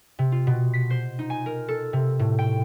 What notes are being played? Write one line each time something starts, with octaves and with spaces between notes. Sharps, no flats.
C3
F4
B2
B6
C5
D#4
G#5
A#4
A4
C3
A2
G5